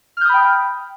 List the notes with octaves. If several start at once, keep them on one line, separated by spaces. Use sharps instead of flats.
G5 B5 D#6 F6 G6